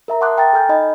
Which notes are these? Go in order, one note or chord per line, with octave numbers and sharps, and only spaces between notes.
A#4 E5 A#5
F#5 A5 C6 D6 D#6 F#6
G5 A#5 F6 A6
A4 G#5 F6 G6
D#4 D#5 B5